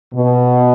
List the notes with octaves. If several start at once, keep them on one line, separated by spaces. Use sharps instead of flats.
B2